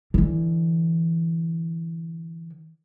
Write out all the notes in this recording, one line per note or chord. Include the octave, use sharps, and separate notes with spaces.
D3 E3